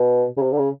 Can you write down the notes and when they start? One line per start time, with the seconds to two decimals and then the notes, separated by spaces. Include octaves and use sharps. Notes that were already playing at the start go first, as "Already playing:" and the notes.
Already playing: B2
0.37 C#3
0.42 C3
0.52 D3
0.59 C#3